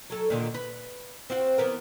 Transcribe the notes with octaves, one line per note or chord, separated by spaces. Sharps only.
F#3 A4
A#2 D3 D#3
B4
C4 F4 F#4
E3 B3 A#4